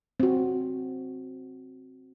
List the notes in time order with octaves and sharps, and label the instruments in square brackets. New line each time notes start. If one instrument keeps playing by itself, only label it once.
[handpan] C4 F#4